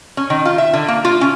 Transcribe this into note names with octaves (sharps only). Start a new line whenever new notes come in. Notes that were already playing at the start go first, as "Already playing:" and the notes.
C#4
D#3
F4
E5
D3
A#3
F4
C#4